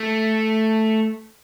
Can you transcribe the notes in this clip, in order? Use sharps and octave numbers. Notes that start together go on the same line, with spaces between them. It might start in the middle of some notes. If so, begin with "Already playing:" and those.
Already playing: A3